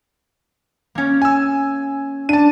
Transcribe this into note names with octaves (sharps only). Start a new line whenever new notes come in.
A#3 C#4
G#5 E6
D4 A5 D#7